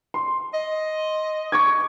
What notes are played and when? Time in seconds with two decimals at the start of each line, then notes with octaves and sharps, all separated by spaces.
0.14 C6
0.54 D#5
1.52 C#6 D6 G#6